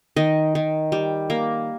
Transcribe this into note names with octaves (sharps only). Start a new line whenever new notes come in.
D#3 D#5
D#3
G3
A#3